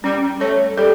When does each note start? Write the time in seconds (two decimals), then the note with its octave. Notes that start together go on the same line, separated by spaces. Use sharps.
0.04 G3 C#4
0.40 A3 C#5
0.77 G3 A4